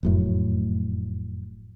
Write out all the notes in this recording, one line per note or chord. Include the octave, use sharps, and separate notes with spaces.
F1 F#2 A2